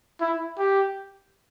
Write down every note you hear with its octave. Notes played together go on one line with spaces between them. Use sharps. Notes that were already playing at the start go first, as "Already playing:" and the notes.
E4
G4